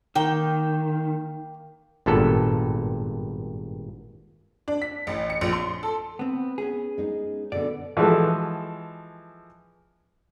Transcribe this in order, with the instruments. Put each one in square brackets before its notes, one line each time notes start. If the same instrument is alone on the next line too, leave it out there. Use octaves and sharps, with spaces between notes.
[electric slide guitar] D#3 [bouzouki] A#3 G5
[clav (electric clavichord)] G#1 G2 A#2 B3 A4
[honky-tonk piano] D4
B6
A1
C#7
A#1
C6
A4
[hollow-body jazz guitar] B3 C4
B3 C#4 G#4
[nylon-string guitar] G#3 D#4
[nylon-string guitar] B2 D3 B3 [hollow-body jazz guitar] D5
[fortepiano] E3 F3 G#3 F#4 G#4 A4